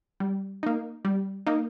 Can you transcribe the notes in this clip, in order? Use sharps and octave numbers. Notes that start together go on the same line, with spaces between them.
G3
A#3 D#4
G3
A#3 D#4